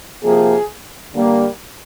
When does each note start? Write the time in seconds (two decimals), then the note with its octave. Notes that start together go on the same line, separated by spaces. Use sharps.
0.24 C3 F3 A#3 G#4
1.14 D3 G3 A#3